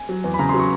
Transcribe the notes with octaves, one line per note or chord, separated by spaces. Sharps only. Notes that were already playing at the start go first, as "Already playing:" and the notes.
Already playing: G#5
F#3
E2
B5
C#3 A#5
F#3 C6
C#6